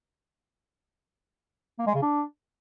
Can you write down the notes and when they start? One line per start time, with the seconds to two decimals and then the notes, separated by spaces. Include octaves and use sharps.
1.79 A#3
1.87 G#3
1.95 C#3
2.03 D4